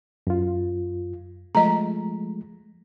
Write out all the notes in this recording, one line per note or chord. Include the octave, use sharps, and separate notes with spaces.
F#2 F4
F3 G#3 A3 D#5 A#5